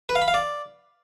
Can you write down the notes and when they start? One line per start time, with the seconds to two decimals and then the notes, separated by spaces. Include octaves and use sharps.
0.09 B4
0.15 F5
0.22 B5
0.28 F5
0.34 D5